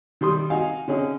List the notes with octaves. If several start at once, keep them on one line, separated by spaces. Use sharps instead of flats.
D#3 G3 C6 D#6
D#4 F#4 F5 G#5
D3 C#4 D#4 G#4